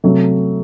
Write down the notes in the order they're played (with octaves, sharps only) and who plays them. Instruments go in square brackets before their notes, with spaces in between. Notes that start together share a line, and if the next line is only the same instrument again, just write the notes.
[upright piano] C3 F#3 A3